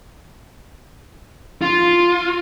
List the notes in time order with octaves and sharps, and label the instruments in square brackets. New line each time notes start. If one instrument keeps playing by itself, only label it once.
[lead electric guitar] F4